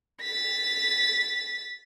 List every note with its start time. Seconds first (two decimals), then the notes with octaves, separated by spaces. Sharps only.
0.21 A6 B6